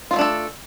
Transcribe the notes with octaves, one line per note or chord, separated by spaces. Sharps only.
F#3 A3 D4 F4 A4